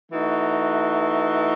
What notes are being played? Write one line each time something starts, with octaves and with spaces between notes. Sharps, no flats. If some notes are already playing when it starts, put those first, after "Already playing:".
E3 A3 D#4 F#4